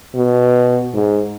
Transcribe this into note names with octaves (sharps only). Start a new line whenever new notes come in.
B2
G#2